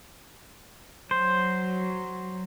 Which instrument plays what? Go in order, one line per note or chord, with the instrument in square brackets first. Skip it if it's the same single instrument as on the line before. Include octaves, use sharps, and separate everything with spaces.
[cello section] F#3 [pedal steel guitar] C5